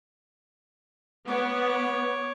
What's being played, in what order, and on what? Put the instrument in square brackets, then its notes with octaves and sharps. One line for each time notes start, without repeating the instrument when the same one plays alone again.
[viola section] B3 [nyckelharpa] C#5 D6